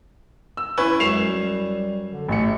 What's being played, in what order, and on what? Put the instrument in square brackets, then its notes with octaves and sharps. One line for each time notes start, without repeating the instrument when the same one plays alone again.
[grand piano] E6
[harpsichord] C#4 [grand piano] E4 B4
[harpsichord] F#2 [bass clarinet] G#3 [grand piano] C7 E7 F7
[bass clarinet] G3
D3
[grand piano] A1 C#7 [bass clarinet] A3